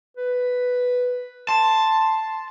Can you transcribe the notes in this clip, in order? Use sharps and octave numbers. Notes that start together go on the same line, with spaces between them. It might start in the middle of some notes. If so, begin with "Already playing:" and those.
B4
A5 C6